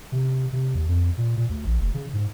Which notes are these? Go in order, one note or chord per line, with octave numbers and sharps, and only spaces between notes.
C3
C3
D#2
F2
A#2
A#2
D2
A#1
F1
C#3
G#2